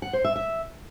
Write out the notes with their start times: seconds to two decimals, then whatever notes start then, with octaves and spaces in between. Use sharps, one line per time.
0.02 F#5
0.13 C5
0.25 E5
0.36 E5